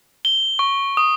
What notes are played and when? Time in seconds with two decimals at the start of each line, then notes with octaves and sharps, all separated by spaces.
0.25 G7
0.59 C#6
0.97 D#6